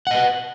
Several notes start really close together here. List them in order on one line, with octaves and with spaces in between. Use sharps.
F#5 D#5 B4